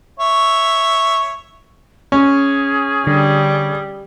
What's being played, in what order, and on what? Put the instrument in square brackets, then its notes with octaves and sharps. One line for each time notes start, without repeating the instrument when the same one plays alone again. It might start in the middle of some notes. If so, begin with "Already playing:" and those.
[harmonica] C#5 E5
[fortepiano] C#4 [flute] G#4
[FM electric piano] D3 [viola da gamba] G3